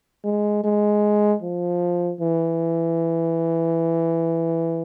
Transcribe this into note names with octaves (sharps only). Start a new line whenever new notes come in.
G#3
G#3
F3
E3